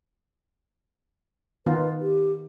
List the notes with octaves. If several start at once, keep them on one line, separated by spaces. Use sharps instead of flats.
D#3 B3 F4 B4
G4